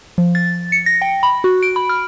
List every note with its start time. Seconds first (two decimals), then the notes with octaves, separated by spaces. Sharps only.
0.18 F3
0.35 A6
0.72 C#7
0.86 A#6
1.02 G5
1.23 B5
1.44 F#4
1.63 D7
1.76 B5
1.89 F6